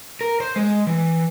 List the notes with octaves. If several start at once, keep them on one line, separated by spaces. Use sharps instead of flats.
A#4
C5
G#3
E3